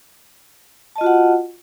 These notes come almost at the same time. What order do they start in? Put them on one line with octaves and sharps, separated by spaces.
A5 D#5 F4 F#4 F#5